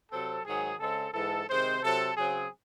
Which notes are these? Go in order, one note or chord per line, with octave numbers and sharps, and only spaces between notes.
C3 F#3 C4 A4
G#2 D#3 F#3 G#4
C#3 G#3 C4 A4
G#2 E3 G#3 A4
C3 D#3 G#3 C4 C5
C3 F#3 C4 A4
C#3 F#3 C4 G#4